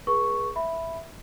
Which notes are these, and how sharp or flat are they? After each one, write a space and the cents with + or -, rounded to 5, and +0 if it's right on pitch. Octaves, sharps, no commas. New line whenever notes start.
G#4 +0 B4 -35 C#6 +0
E5 +0 B5 +0